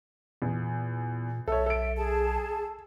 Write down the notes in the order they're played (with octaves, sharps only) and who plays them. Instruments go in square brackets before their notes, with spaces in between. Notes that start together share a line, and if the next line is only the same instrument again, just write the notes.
[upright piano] E2 [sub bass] A#2
[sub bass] B1 [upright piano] A4 C#5 [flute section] E5
[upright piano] A4 D7
[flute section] G#4 A5